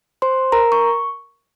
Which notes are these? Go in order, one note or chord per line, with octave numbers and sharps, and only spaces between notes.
C5 C6
A#4 A#5
C#6